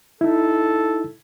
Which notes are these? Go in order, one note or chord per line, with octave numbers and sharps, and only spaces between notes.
D#4 E4 A4